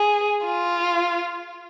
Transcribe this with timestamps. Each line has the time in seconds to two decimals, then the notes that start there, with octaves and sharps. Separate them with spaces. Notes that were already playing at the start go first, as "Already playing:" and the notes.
Already playing: G#4
0.46 F4